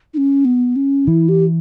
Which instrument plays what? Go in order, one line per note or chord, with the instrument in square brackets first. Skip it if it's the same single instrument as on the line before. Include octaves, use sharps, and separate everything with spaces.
[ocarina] D#4
C#4
B3
C#4
[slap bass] E3 [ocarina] E4
[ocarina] G4